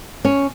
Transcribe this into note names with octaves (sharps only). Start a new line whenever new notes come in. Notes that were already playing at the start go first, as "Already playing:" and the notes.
C#4